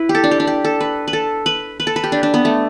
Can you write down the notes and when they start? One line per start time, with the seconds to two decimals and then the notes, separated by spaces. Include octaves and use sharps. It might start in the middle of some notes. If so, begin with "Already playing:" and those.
Already playing: E4 B4
0.09 G4
0.15 A4
0.24 D4
0.31 G4
0.40 D4
0.47 G4
0.65 A4
0.81 B4
1.08 B4
1.13 A4
1.46 B4
1.80 B4
1.87 A4
1.96 B4
2.04 G4
2.12 D4
2.23 D4
2.34 B3
2.45 A3